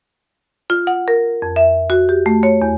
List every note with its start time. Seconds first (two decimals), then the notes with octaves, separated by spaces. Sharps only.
0.70 F4
0.87 F#5
1.08 A#4
1.42 F2
1.56 E5
1.90 F#4
2.09 G4
2.26 A3
2.43 C#5
2.62 E2